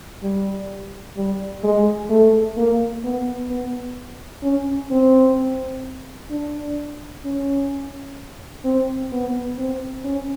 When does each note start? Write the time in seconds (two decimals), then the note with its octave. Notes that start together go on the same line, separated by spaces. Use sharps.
0.23 G3
1.16 G3
1.64 G#3
2.09 A3
2.57 A#3
3.04 B3
3.50 B3
4.43 C#4
4.91 C4
6.30 D4
7.25 C#4
8.64 C4
9.12 B3
9.58 C4
10.04 C#4